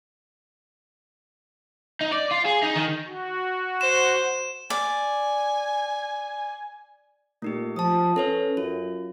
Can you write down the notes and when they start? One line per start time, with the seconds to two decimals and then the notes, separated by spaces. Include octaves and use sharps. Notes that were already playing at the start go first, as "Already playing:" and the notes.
2.01 D#4
2.12 D5
2.32 F4
2.46 G#4
2.64 D#4
2.76 D#3
3.06 F#4
3.81 C5 E7
4.70 D5 G#5
7.42 A#2 A3 D#4 G4
7.76 F3 A5 D#6
8.16 C#4 A4 B4 C#5
8.57 F#2 F4